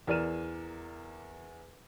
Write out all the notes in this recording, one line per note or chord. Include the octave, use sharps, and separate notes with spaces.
E2 A#4 D5 F6 D#7 E7